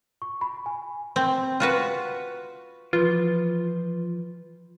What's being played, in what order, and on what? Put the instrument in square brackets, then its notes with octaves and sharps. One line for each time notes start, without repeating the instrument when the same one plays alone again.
[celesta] C#6
B5
G#5
[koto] C4
F4 F#4 B4
[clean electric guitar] E3 F3 [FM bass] F4 [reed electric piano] B4